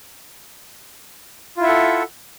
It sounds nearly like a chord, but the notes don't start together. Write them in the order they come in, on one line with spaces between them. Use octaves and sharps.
F4 E4 E5 F#5 A4